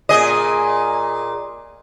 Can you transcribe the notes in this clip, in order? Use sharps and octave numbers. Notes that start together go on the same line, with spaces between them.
A#2 G#4 D#5